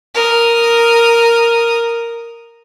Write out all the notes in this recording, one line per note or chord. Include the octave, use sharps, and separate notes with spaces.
A#4 D#6